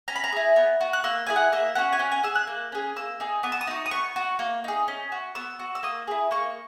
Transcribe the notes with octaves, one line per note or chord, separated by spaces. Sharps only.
C#4 A#5
B5
A#5
E4 G#4
B3
F#4
F#6
A#3 E6
E4 G#4 G#5
F#5
A#3 E5
C#4 F#4 F#5
G#5
C#4 F#5
G#5
G#4 E6
F#6
A#3
C#4 G#4
A#3 E6
D#4 G#4
B3 D#6
E6
D#6
D#4 F#4
D#6
B3 C#6
F#4
A#3
D#4 G#4
C#4
F#4
B3 E6
F#4
E6
A#3 D#6
E4 G#4
A#3 C#6